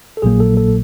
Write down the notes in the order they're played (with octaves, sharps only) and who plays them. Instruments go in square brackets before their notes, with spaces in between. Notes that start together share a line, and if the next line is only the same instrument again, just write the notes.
[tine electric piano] A4
A#1 A#2 F#3 A#3 G#4
A4
A4